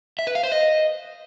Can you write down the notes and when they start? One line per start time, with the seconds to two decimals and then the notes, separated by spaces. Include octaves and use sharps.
0.19 E5
0.27 B4
0.35 F5
0.44 C5
0.52 D#5